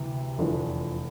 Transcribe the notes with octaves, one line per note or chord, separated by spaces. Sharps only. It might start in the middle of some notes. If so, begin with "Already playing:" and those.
Already playing: D2 C3 E3
F1 E2 D3 F3